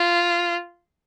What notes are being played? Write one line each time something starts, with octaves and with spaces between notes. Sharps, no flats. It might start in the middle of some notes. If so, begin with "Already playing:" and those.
Already playing: F4